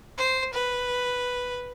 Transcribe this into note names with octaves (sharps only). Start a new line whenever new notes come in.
C5
B4